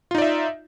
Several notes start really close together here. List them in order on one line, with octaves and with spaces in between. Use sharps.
F4 D#4 D5 E5